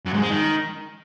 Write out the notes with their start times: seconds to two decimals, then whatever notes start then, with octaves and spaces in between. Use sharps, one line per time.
0.06 F#2
0.14 G#2
0.22 G#3
0.30 D#3